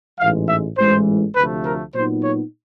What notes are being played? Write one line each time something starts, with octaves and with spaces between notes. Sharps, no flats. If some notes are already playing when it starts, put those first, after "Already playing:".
A1 G#2 E3 G#3 F5
E5
A1 G#2 E3 G#3 C5
D2 C3 F3 A3 B4
A#4
A#2 F#3 B3 D#4 C5
C#5